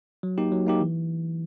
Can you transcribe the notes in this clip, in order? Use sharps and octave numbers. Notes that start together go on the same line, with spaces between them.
F#3
A#3 D#4 G4
F#3
A#3 D#4 G4
E3